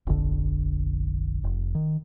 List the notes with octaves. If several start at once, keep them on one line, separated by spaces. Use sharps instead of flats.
F1 A#1 D3
F1
D#3